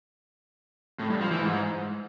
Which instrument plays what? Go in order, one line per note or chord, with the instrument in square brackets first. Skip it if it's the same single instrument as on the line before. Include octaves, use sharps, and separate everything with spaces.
[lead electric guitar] A2
G2
F3
E3
G#2